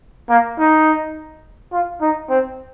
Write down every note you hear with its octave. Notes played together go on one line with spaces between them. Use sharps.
A#3
D#4
F4
D#4
C4